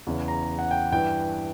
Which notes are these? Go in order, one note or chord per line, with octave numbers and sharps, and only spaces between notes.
E2 C#3 E3
A#5
F#5
G5
G2 E3 G5